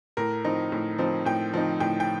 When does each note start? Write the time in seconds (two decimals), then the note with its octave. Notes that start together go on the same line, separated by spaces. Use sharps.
0.17 A2 A#4
0.45 F3 C4 D#4
0.72 A2
0.99 F3 C4 D#4
1.25 A2 G5
1.54 F3 C4 D#4
1.80 A2 G5
2.00 G5